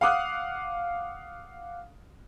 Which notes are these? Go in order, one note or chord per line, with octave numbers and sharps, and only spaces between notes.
F5 F#5 D6 D#6 F6 F#6